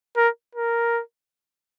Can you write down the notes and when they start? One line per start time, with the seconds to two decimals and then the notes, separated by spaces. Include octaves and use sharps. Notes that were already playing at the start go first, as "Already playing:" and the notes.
0.17 A#4
0.55 A#4